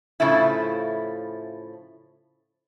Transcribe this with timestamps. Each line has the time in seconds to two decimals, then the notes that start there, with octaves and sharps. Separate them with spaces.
0.20 A2 C#3 F3 A3 E4